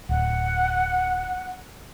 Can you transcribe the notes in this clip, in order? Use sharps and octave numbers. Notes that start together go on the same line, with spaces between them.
D1 F#5